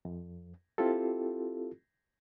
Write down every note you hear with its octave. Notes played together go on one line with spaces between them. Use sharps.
F2
C4 E4 F4 G4 A4